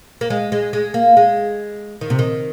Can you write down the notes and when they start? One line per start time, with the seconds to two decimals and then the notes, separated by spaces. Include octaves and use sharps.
0.21 A#3
0.30 G#3
0.52 G#3
0.73 G#3
0.94 A#3
1.17 G#3
2.01 D#3
2.10 C3
2.19 D#3